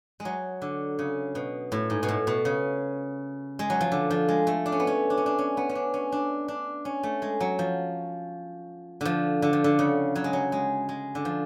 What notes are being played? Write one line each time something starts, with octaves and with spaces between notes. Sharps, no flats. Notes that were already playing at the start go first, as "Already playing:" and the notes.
G#3
F#3
D3
C#3
B2
A2
G#2
B2
A2
B2
C#3
G#3
F#3
F3
D3
F3
G#3
A3
D4
C#4
B3
C#4
D4
C#4
D4
C#4
B3
C#4
D4
C#4
D4
D4
C#4
A3
G#3
F#3
F3
D3 F3
D3
F3
D3
C#3
F#3
G#3
F#3
G#3
G#3
D3
F3